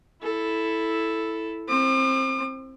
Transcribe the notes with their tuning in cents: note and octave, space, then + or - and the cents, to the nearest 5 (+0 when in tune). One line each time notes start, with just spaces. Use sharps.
E4 +0 A4 +0
C4 +20 D6 +45